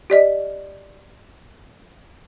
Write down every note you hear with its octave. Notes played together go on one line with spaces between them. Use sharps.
G4 D5 D#5